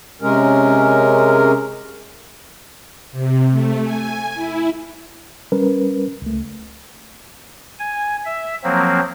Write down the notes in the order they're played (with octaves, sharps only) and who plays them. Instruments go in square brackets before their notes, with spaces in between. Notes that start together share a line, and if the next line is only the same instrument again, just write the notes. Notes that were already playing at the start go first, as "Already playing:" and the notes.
[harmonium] C3 G#3 C#4 A#4
[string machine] C3
A3
G#5
E4
[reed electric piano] G3 C#4 A#4 B4
C#2 A3
[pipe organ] G#5
E5
F3 F#3 A#3 C4